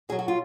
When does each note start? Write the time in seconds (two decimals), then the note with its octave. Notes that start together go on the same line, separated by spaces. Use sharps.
0.09 B2 F#3 G#4
0.19 F#4
0.28 F4